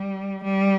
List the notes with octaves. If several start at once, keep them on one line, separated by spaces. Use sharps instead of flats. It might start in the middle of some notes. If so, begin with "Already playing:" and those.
Already playing: G3
G3